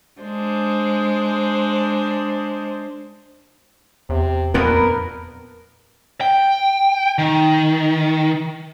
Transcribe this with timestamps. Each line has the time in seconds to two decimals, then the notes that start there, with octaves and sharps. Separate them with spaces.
0.21 G#3 D4 C5
4.09 E2 C3
4.54 F2 A#2 B3 D4 A#4 B4
6.21 G5
7.18 D#3